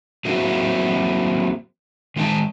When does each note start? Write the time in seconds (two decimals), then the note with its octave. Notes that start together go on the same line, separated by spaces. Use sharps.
0.25 F#3 A#3 C4 E4 F#4 A#4
2.16 D#3 G#3 D#5 G5 A5